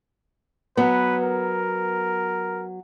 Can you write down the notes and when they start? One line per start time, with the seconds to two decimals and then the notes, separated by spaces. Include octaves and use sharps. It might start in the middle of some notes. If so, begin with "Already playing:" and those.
0.77 F#3 B3 B4
1.23 A#4